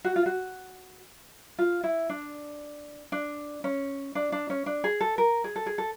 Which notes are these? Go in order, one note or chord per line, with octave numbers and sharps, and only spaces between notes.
F#4
F4
F#4
F4
E4
D4
D4
C#4
D4
D4
C#4
D4
G#4
A4
A#4
G#4
A4
G#4
A4